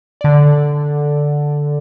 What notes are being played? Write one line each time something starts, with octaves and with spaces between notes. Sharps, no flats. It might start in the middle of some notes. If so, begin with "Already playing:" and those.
D3 D5